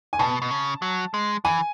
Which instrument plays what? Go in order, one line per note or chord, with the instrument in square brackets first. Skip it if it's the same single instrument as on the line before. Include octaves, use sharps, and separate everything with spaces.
[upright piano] G#5
[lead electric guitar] B2 [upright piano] A5
[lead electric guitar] B2
C#3
F#3
G#3
[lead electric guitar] E3 [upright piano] G#5